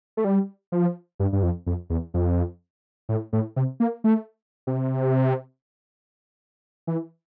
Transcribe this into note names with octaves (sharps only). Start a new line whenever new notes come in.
A3
G3
F3
G2
G2
F2
F2
E2
F2
A2
A2
C3
A#3
A3
C3
E3